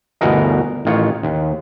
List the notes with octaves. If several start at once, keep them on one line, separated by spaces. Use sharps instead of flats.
G1 D2 B2 E3 A#4 D#5
A1 D#3 F4 C#5
D#2